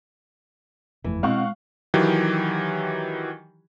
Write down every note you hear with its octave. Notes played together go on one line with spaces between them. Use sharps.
G1 F2 E3 A3
B2 G#3 C4 F5 F#5 C#6
D#3 E3 F#3 G4